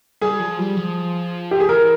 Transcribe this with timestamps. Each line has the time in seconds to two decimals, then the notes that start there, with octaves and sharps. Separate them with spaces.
0.21 G3 G#4
0.40 F3
0.59 G3
0.77 F3
1.51 G4
1.60 G#4
1.69 E3 A#4